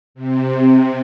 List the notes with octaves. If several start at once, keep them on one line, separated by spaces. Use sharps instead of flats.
C3